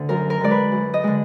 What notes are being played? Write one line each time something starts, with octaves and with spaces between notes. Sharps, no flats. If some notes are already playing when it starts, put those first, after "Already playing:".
Already playing: D2 D3
F#2 A#4
A#4
D3 G#3 D5
B4
F#2
D#5
D3 G#3